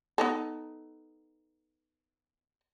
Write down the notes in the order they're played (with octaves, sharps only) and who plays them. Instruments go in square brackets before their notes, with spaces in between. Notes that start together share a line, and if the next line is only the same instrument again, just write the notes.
[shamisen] B3 D#4 A4